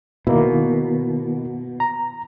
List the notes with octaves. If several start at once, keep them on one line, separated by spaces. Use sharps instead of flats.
B2 D#3 A#3 E4
A#5